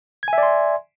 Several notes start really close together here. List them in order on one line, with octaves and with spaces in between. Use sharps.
G#6 G#5 E5 D5 C6